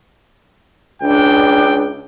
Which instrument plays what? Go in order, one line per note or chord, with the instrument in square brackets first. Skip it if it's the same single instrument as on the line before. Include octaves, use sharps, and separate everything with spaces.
[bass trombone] C#2 [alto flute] D4 [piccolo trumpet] G5